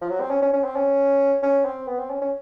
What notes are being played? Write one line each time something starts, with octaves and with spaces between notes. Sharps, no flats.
F3
F#3
C4
C#4
C#4
C#4
C4
C#4
C#4
C4
B3
C4
C#4
C#4